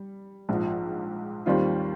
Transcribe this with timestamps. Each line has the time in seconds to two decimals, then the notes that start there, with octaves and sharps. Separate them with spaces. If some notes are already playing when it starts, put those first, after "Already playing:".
Already playing: G3
0.49 A#1 G#2 F3
1.46 D#2 D#3 G3 C4 F4